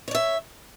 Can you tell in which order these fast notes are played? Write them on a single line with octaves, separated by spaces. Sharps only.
C#5 D5 E5